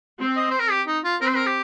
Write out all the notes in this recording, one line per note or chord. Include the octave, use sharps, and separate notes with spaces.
C4
D#5
C5
A#4
G4
D#4
F4
C4 A#4
C5
A#4
G4